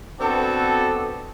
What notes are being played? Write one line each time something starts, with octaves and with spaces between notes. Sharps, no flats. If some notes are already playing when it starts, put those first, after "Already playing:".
B3 C4 D4 F#4 A4